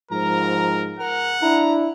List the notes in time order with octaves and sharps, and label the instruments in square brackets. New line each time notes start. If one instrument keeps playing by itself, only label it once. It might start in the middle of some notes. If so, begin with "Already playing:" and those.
[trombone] G#2 [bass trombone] F3 [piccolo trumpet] A#4 [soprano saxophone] A#5
[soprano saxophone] A#4 [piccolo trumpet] F#5
[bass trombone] D4 [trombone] E4 [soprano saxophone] A#5